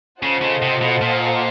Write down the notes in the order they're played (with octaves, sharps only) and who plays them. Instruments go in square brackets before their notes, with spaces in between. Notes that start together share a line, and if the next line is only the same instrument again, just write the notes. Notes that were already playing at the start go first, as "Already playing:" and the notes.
[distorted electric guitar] C#3 [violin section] F4 A4 C5 D#5 F#5
[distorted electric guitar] C#3
C3
B2
A#2